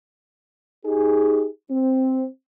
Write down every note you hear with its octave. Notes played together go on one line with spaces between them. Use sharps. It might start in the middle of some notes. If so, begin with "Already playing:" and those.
D#4 G4 G#4
C4